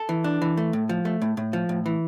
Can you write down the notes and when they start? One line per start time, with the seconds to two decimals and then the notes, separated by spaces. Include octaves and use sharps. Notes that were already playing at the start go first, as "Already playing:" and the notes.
Already playing: A4
0.09 E3
0.24 D4
0.42 E3
0.57 A3
0.73 A2
0.89 F3
1.05 A3
1.22 A2
1.37 A2
1.53 F3
1.69 A2
1.86 E3